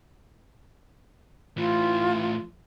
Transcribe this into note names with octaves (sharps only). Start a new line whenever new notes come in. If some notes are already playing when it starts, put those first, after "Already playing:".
A2 E3 F4